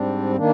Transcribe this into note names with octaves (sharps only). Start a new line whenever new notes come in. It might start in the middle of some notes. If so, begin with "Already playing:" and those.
Already playing: G#2 G3 C4 D4
D#3 A#3 D4